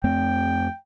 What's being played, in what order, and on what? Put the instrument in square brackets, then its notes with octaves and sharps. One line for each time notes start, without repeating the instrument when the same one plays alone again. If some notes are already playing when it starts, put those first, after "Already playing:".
[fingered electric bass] F2 A3 C4 [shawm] G5